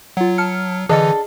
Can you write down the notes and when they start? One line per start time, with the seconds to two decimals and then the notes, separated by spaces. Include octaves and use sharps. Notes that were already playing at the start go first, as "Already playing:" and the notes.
0.17 F#3 F4 F#5
0.38 A5 F6 C#7
0.89 D3 E3 D4 G#4 A4 D#5